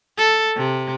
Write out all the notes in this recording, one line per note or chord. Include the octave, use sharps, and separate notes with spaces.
A4
C3